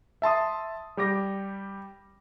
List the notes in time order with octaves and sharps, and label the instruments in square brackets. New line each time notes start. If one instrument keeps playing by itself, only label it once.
[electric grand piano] E5 A5 C6 D#6
G3 G4 D6 A#6